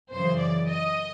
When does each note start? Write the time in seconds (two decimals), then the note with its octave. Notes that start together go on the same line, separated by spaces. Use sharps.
0.11 F#2 C#3 E3 C5
0.39 D5
0.68 D#5